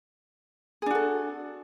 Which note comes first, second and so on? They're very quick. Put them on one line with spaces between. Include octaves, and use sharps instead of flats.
G#4 D4 F#4 A4